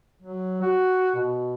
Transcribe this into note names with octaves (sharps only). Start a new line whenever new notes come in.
F#3
F#4
B2